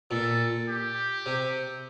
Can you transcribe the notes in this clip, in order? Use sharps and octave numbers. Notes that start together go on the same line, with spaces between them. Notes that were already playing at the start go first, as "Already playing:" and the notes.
A#2 A4
G4
C3